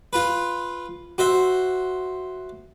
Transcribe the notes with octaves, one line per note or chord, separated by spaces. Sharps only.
F4 B4
F#4 C5 E5